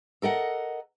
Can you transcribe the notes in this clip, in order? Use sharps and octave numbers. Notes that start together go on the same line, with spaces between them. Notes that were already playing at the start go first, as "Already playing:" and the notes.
A4 A#4 D#5 F#5